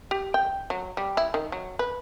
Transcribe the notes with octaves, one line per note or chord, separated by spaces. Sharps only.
G4
G5
F#3
G3
E4
D#3
F#3
B4